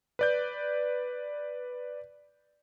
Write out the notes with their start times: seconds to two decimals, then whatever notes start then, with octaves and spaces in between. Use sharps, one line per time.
0.19 B4 D5 G6